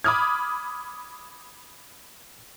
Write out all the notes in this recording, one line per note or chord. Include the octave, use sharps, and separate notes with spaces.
B5 D6 D#6 F6 G#6